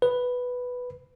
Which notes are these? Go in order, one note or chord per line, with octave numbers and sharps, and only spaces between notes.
B4